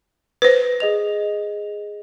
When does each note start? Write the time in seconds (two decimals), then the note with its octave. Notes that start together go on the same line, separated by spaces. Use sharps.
0.42 B4 C5
0.80 G#4 D#5 F7